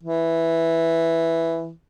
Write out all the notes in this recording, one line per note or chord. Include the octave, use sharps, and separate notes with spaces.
E3